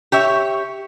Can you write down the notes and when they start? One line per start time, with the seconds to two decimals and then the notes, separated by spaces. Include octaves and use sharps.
0.12 G4 C#5 E5